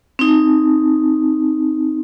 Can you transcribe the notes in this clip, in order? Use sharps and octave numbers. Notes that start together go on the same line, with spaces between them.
C4 D#4